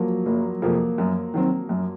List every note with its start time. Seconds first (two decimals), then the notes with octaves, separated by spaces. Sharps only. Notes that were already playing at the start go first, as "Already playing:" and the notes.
Already playing: F3 F#3 A#3
0.26 F#1 A#3
0.62 F2 C3 F3 G#3 A#3
0.98 F#2
1.34 D#3 F#3 C4
1.69 F#2